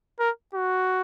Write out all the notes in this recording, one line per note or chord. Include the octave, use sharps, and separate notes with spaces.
A#4
F#4